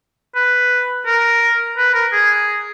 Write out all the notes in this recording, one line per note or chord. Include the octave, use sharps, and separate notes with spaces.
B4
A#4
B4
A#4
G#4